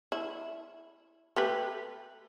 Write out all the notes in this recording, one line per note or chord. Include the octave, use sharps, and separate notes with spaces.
E4
A3 G4 B4